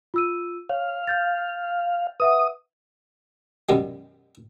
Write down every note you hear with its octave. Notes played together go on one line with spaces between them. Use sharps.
F4 E6 D#7
C#5 F5
F6 G6 A6
B4 E5 F#5 D#6
F#2 B2 D#3 G3 G#3